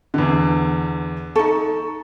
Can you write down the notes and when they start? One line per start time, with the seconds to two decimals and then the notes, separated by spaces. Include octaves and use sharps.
0.14 E2 D3
1.35 D#4 A4 C#6